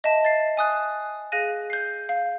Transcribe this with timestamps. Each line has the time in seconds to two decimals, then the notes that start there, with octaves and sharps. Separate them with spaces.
0.04 D#5 E5 A5
0.25 A6 C7
0.57 G#5 D#6 F#6
1.32 G#4 F5 F#6 A#6 D#7
1.70 G6 C7
2.09 F5